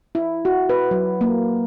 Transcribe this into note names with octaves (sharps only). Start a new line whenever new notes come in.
E4
F#4
B4
F#3
A#3